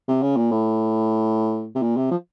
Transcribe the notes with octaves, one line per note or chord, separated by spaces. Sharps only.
C3
C#3
A#2
A2
C3
A#2
C3
F3